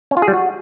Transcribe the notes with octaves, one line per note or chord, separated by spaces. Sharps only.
C#4
F4
G#4
G3
F#4